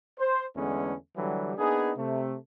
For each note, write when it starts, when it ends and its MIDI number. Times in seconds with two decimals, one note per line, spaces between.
0.19 0.45 72
0.56 0.95 40
0.56 0.95 50
0.56 0.95 56
0.56 0.95 57
0.56 0.95 59
0.56 0.95 61
1.17 1.53 50
1.17 1.53 52
1.17 1.53 54
1.17 1.53 55
1.58 1.92 58
1.58 1.92 59
1.58 1.92 62
1.58 1.92 63
1.58 1.92 68
1.97 2.36 48
1.97 2.36 57